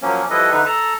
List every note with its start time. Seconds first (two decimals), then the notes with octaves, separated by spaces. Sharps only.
0.02 F3 F#3 A#3 C#4
0.30 F3 G3 E4 A4 B4 D#5
0.52 D3 D#4 B4 E5
0.66 A4 A5 A#5